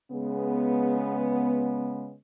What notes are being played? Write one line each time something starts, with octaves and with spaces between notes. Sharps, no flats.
C#3 G#3 B3